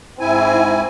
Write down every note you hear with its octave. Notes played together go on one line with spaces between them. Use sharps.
G#2 C4 E4 G#5